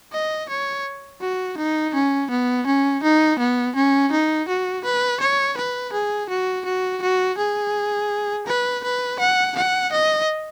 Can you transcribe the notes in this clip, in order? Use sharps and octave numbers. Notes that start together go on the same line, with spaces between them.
D#5
C#5
F#4
D#4
C#4
B3
C#4
D#4
B3
C#4
D#4
F#4
B4
C#5
B4
G#4
F#4
F#4
F#4
G#4
B4
B4
F#5
F#5
D#5